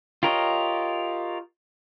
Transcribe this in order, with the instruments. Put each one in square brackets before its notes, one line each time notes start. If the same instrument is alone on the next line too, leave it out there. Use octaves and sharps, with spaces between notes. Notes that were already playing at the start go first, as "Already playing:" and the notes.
[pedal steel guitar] F4 G4 A#4 C#5 D#5